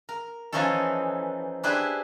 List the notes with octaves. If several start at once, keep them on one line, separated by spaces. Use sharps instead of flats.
A#4
E3 F3 C#4 D#4 A4
D4 E4 G4 G#4 B4 C5